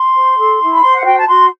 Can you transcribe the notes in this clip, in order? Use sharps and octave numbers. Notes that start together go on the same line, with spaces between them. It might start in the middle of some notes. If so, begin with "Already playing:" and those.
Already playing: C6
C5
A4
E4
B5
C5 C6
F#5
F#4 G5
A5
F#4 C6